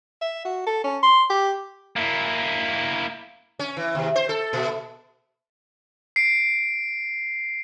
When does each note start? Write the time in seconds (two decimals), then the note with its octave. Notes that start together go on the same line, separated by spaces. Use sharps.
0.21 E5
0.45 F#4
0.67 A4
0.84 C#4
1.03 C6
1.30 G4
1.96 A#3 E4
3.59 C#4
3.77 E3
3.95 D#2 C3
4.16 C5
4.29 A4
4.53 A#2
6.16 C7 D7